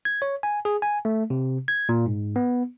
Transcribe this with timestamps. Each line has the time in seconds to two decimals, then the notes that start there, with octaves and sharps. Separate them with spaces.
0.05 G#6
0.22 C#5
0.43 G#5
0.65 G#4
0.82 G#5
1.05 A3
1.30 C3
1.68 G#6
1.89 A#2
2.06 G#2
2.36 B3